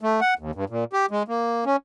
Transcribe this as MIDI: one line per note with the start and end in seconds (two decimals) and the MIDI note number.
0.01 0.20 57
0.21 0.34 78
0.39 0.51 39
0.55 0.65 43
0.70 0.84 46
0.93 1.06 67
1.11 1.23 56
1.28 1.65 58
1.66 1.76 61